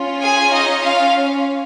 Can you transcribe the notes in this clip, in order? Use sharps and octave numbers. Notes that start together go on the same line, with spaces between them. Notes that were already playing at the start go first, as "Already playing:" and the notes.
Already playing: C#4 F4
G#4 G#5
D#4 D#5
F4 F5